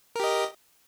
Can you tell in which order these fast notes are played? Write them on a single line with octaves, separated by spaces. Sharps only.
A#4 G4 D#5